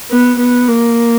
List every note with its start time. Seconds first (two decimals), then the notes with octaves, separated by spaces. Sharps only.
0.10 B3
0.40 B3
0.69 A#3